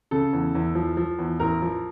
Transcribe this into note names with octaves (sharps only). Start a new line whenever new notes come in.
C#3 A4
E2
E2
F3
F3
E2
A1 A#4
F3